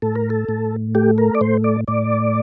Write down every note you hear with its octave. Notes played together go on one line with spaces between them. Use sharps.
A2 A4
A#4
A4
A2
A3 G4
A#4
D5
A2 C5
D5
A2 D5